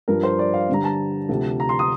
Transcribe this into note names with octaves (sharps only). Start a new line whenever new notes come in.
G2 F3 A#4
C5
D5
F5
G2 D3 G3 A#5
A5
D2 C3 F3
A#5
C6
D#6